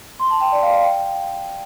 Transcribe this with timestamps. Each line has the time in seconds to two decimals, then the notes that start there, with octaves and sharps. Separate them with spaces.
0.20 C6
0.30 A5
0.41 G5
0.52 D5
0.63 F5
0.73 F5
0.84 G5